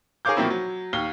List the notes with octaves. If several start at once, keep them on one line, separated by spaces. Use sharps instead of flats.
G#4 A#4 C#5 F5 D6 G6
B2 F3 F#3 A#3 C4 E4
F#3
D#2 F5 G7